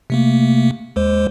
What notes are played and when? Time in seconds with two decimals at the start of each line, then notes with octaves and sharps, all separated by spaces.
0.10 C3 A3 A#3
0.96 D#2 G#3 C5